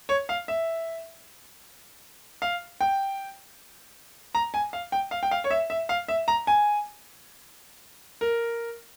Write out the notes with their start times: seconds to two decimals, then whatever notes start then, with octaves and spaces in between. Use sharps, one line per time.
0.09 C#5
0.29 F5
0.48 E5
2.42 F5
2.81 G5
4.35 A#5
4.54 G#5
4.73 F5
4.92 G5
5.11 F5
5.23 G5
5.31 F5
5.44 C#5
5.51 E5
5.70 E5
5.89 F5
6.08 E5
6.28 A#5
6.47 G#5
8.21 A#4